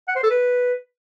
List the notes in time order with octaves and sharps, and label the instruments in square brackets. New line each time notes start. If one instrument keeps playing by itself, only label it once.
[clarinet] F#5
C5
A4
B4